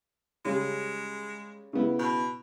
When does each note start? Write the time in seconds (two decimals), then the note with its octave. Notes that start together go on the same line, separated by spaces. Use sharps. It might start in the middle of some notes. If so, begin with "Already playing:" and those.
0.45 C#3 G3 G#3 C#4
1.73 C#3 B3 E4
1.99 B2